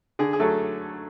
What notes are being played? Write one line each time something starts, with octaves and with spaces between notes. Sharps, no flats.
D3 G#4
G#4
F#3 A3 A4